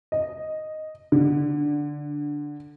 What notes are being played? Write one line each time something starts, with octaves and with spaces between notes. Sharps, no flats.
D#5
D3